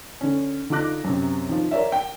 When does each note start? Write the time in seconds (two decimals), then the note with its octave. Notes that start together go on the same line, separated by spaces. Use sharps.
0.21 D3 C#4
0.70 D3 D#4 F4 D6 F#6 A#6
1.04 F#2 C3
1.49 D#3 F3
1.71 A#4 C#5 D5 E5
1.92 G5